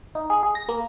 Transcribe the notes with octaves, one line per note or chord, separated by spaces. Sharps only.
D#4
G#4
G#4
A#6
A#3